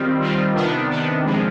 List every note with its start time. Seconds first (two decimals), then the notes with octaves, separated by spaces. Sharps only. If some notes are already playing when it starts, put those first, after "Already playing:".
Already playing: D#3 G3 C4 F4
0.21 D#3 G3 C4 F4
0.55 C3 D#3 B3 D4
0.90 C3 D#3 B3 D4
1.25 C3 F3 G#3